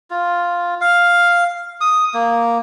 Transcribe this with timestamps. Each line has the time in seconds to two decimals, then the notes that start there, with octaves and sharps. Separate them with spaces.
0.10 F4
0.81 F5
1.81 D#6
2.14 A#3